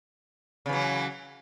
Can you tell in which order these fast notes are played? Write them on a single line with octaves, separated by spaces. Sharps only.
C#3 E3 F#3